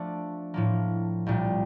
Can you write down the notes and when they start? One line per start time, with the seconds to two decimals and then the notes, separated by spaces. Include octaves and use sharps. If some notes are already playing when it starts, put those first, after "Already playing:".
Already playing: F3 A3 D4
0.54 A2 F3 A#3
1.26 C2 A#2 G3